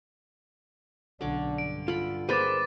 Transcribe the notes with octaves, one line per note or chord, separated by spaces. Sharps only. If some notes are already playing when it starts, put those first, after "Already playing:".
B1 D3 C#4 D4 D6
G2 D7
F4 A4 B5
A#3 G#4 B4 C5 B5 D6 A6 D#7